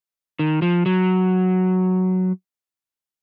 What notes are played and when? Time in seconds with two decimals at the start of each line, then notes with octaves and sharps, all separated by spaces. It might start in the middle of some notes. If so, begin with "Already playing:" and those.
0.39 D#3
0.62 F3
0.86 F#3